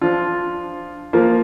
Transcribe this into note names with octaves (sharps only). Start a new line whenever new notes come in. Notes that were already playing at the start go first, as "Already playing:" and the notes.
F3 D4 F4
F3 A#3 F4